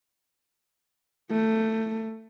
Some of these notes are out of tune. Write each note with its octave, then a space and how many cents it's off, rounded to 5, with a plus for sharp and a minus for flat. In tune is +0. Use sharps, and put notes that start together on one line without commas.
A3 +15